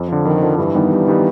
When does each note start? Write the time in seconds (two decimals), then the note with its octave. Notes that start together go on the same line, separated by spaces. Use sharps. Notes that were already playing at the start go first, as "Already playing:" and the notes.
Already playing: F2
0.08 D3 F3
0.25 F2 D#3
0.42 D3 F3
0.58 G2 E3
0.75 D#3 G3 B3 D#4
0.92 G2
1.08 D#3 G3 B3 D#4